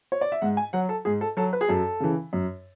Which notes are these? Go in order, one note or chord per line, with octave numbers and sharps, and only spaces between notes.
C#5
D5
E5
G#2 F#5
G#5
F#3 F#5
A4
G#2 G#4
A4
F#3 A4
B4
G#4
F#2 A4
C#3 E3
F#2